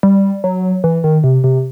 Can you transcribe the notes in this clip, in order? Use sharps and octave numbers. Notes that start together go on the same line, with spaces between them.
G3
F#3
E3
D#3
C3
C3